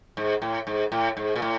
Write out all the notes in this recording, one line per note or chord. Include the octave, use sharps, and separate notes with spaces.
G#2
A2
G#2
A2
G#2
A#2
A2